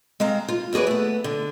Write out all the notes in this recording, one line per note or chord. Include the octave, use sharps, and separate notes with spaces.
G#3 C4 F5 A#5
F4
D#2 F#4 G#4 B4 D5
A3 B3
D3